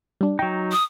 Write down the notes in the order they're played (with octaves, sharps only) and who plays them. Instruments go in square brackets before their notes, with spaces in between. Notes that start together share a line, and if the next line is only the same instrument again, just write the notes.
[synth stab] G3 D4
[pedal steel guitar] F#3 D#4 [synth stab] G5
[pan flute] D#6